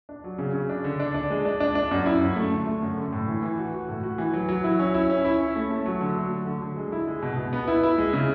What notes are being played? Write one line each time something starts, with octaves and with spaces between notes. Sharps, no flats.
D4
F#3
C#3
C#3
D4
D3
D4
D4
G#3
D4
D4
D4
F#2
E4
F#2
A3
D3
A3
F#2
D3
A2
E3
E3
F#4
F#4
A2
F#4
E3
F#3
F#3
E4
C#4
E4
C#4
E4
C#4
A3
A3
F#3
D3
A3
F#3
D3
D3
G#3
E4
G#3
B2
B2
B3
E4
E4
G#3
C#3